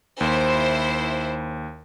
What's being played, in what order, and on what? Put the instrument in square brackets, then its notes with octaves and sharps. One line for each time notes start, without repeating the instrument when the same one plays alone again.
[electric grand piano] D#2 [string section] E4 C5